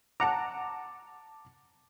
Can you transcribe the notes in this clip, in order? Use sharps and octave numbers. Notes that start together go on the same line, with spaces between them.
F#5 A5 A#5 D6